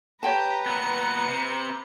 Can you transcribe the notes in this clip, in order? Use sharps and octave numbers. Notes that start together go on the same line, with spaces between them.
G4 B4 C#5 G5 A5 A#5
A#2 B3 C#7
C3